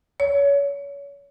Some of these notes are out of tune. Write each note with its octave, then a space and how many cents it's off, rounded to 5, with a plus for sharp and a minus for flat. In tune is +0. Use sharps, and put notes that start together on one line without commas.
C#5 +30